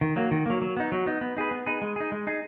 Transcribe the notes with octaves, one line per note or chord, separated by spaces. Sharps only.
D#3
F#3 A#3
D#3
F#3 A#3
F#3
B3 D#4
F#3
B3 D#4
B3
D#4 G#4 B4
B3
D#4 G#4 B4
G#3
D#4 G#4
G#3
D#4 G#4